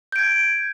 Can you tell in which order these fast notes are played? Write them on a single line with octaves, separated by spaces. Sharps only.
G6 D7 G#6